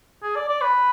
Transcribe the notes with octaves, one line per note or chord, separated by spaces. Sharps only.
G#4
D5
D5
B4